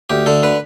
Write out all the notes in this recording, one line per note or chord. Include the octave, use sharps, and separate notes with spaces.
D2 G4
D3 A4
D3 B4